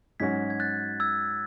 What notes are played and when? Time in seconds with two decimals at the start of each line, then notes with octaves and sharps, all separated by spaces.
0.20 G#2 F#3 C#4 F#4 G#6 B6
0.50 G#6
0.60 F#6 A6
1.00 E6 G#6